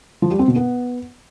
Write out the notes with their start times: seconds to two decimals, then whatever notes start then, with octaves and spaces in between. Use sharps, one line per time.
0.22 F3
0.31 G3
0.39 C4
0.48 B2
0.56 B3